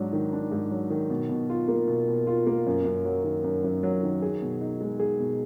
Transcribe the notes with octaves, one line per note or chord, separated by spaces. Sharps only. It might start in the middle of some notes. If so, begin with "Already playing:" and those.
Already playing: G#2 F#3 D4
D#3
D4
G#2
F#3
D#3
B2
B2
F4
A#3
B2
B2
F4
A#3
F#2
F#2
F#3
D#3
F#2
F#2
F#3
D#3
G#4
B2
D#4
G#3
G#4
B2